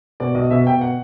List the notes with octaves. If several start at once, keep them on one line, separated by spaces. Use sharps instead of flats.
B2 D5
B1 D#5
B2 E5
B2 G5
F#5